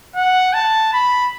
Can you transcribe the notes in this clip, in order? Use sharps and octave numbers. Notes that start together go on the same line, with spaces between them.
F#5
A5
B5